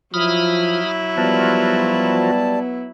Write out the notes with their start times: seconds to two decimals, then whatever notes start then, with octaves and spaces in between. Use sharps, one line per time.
0.14 F3 F#3 E4 B5 D#6 F6
1.18 F3 G3 B3 F4 F#4 A5